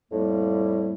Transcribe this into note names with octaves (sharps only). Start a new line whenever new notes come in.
F2 A2 G3 A#3